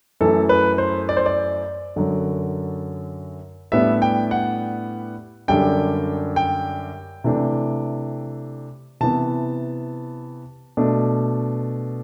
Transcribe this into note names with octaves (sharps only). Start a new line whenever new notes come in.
F#2 E3 A3 A4
B4
C5
D5
C5
D5
F#2 D3 F#3
A2 G3 B3 D4 E5
G5
F#5
F#2 D3 G3 D4 G5
G5
C3 E3 A3 D4
C3 E3 B3 A5
B2 A3 D4